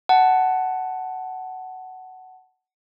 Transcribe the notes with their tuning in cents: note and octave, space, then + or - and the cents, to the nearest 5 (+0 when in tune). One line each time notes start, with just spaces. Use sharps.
F#5 +10 A5 +0